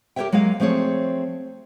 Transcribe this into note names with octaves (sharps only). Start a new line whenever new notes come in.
G4 A#4 C5 C#5 E5 G5
F#3 G#3 A#3 G#4 F5
F3 A3 C4 G#4 C#5